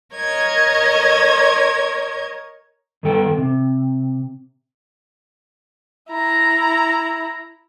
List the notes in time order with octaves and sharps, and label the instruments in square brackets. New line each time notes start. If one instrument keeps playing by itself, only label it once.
[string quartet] A#4 C#5 D#5 G#6
[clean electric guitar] G2 D#3 B3 A4 G5
C3
[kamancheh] E4 A#5